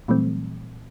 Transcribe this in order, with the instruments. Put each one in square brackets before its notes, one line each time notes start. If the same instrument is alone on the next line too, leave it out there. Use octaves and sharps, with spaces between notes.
[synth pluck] A#2 E3 F#3 G3 A3 C4